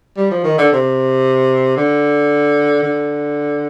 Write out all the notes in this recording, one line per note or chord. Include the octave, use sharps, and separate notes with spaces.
G3
F3
D#3
D3
C3
D3
D3